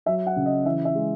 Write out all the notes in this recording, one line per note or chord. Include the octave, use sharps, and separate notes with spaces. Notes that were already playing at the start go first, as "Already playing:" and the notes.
F#3 E5
F#5
C#3
D#5
E3 E5
E5
G#3